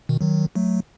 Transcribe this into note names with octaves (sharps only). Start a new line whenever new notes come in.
B2 D#3
D#3 F#3
F#3 A3